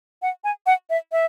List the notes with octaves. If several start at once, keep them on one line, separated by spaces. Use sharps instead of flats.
F#5
G#5
F#5
E5
E5